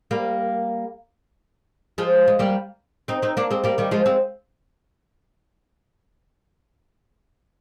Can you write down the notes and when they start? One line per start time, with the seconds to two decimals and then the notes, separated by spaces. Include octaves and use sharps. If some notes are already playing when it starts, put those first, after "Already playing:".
0.11 G3 A#3
1.98 F3 G#3
2.28 G#3
2.39 G3 A#3
3.08 C4 D#4
3.22 C4 D#4
3.37 A#3 D4
3.51 G#3 C4
3.64 G3 A#3
3.78 D#3 G3
3.91 F3 G#3
4.06 G#3 C4